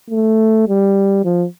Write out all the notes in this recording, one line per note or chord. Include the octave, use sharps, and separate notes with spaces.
A3
G3
F3